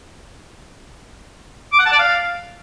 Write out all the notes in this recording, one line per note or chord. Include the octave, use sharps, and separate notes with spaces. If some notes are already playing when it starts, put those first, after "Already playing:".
D6
F#5
A5
D5
F5